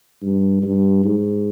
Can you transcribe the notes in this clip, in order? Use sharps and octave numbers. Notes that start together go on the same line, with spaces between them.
G2
G2
G#2